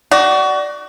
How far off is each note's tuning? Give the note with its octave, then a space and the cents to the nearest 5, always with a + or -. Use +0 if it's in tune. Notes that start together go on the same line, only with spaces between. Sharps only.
F#4 +25 D5 +0